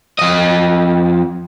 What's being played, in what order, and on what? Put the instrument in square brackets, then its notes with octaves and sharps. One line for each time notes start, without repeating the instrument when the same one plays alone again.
[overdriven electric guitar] F2 D#5